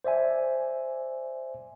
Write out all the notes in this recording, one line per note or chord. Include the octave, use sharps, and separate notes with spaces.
C5 D5 E5 G#5